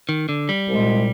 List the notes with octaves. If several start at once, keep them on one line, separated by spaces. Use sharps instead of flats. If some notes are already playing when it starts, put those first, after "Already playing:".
D#3
D3
G3
C2 A#2 G#3